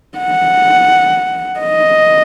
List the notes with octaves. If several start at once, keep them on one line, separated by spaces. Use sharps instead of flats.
F#5
D#5